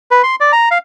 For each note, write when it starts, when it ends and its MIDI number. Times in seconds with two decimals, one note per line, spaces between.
0.11 0.22 71
0.23 0.35 84
0.40 0.52 74
0.52 0.69 82
0.71 0.78 77